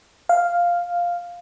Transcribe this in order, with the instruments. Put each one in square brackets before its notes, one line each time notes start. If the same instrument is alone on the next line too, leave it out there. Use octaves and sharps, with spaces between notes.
[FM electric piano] F5